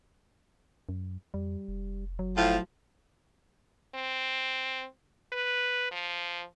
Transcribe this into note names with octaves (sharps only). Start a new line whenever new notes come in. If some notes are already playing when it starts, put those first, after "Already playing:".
F#2
F2 G3
F1
F#1 F#3
A2 F3 F4
C4
B4
F3